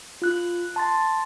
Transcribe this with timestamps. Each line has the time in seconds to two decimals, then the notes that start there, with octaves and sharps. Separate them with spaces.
0.22 F4 F#6
0.76 A5 C6 A6